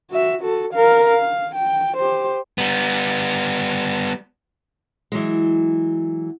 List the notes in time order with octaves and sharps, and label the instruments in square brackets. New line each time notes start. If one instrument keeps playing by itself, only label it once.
[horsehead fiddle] F#4 E5
F#4 A4
A#4 F5
F5
G5
G4 C5
[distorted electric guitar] G3 B3
[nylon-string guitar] E3 F#3 G#3